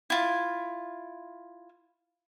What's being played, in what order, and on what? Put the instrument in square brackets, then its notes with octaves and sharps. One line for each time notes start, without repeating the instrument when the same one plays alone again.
[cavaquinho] E4 F4